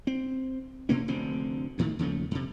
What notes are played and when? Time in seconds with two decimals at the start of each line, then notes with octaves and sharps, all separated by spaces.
0.07 C4
0.89 B2 A#3 C#4
1.08 F1 D2 D3 C4
1.78 D2 A2 D#3
1.99 D#2 C#3 F3 A3
2.31 F2 C3